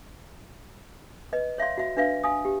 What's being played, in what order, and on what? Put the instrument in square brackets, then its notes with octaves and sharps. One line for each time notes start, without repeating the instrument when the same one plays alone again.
[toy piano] B4 D#5
C#5 E5 F5 C6
F#4 E5
D4 B4 E5 F5
F5 G#5 D#6
G4